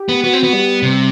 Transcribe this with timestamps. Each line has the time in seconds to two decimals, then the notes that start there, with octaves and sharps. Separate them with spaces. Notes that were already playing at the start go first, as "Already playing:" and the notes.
Already playing: G4
0.09 B3
0.24 B3 F#4
0.33 C4
0.39 B3 F#4
0.53 G3
0.83 C3